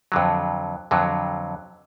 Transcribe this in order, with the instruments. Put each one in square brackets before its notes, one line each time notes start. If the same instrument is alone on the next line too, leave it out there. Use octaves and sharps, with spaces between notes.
[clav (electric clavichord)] F2 D3 F#3
F2 D3 F#3